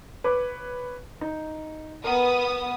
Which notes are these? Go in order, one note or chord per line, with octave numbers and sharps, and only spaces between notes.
B4 C#5 D6
D#4
B3 A#4 D#6